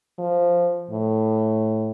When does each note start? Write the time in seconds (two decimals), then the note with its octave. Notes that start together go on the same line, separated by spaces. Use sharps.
0.19 F3
0.91 A2